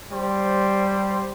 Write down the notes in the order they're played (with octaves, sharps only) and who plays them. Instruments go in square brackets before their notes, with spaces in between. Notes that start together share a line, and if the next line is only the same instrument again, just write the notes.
[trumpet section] G3 C5